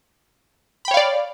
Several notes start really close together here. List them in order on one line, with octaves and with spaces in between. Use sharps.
B5 G5 C#5 F5 D5